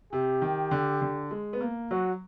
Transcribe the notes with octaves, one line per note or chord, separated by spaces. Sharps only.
C3 G4
D#3
D3
D3
G#3
B3
A#3
F#3 F#4